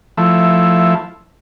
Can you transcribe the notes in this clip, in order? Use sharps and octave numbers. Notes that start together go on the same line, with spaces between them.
F3 A3 E4